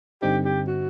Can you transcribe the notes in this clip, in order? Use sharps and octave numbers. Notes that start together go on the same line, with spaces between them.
G2 D3 G3 C4 D#4 G4
G4
F#4